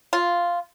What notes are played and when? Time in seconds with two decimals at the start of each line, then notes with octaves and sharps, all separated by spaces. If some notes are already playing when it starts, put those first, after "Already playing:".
0.13 F4